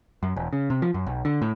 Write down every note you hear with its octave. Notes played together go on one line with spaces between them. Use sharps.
F#2
E1
C#3
C3
F3
F#2
B1
D3
A2